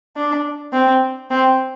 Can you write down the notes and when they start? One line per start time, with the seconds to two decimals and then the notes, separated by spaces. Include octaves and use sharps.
0.16 D4
0.73 C4
1.30 C4